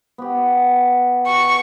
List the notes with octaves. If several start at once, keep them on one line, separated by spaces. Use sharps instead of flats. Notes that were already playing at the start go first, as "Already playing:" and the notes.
B3 G4
C#6